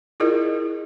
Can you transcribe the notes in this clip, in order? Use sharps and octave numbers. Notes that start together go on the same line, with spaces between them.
E4 F4 G#4 A#4 D#5